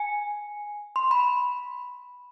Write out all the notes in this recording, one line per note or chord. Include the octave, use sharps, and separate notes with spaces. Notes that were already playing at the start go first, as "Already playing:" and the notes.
Already playing: G#5
C6
B5